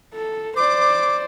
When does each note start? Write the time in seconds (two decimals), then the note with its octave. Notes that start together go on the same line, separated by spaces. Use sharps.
0.13 A4
0.57 C5 D5 D6